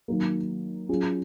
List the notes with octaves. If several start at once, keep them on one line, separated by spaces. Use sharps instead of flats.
D#3 F#3 A#3
F#3 C#4 F4 G#4